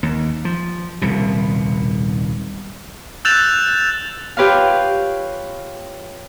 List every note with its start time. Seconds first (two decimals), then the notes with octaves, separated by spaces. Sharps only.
0.03 D#2
0.45 F3
1.02 D#1 C2 B2
3.25 E6 F#6 G6 A6 E7 F7
4.37 F4 G4 B4 C#5 F5